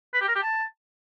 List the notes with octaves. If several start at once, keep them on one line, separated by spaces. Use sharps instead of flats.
B4
G4
A#4
G4
A5